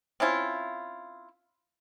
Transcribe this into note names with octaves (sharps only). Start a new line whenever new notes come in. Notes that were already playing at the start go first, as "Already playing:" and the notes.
C4 C#4 E4 F4